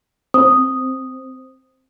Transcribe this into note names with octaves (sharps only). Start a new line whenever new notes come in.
C4 D#6